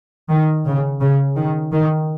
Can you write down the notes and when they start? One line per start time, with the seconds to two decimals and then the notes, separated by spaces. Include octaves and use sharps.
0.30 D#3
0.65 C#3
1.01 C#3
1.36 D#3
1.72 D#3